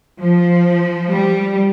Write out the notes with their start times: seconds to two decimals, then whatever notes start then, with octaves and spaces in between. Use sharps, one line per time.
0.20 F3
1.09 G3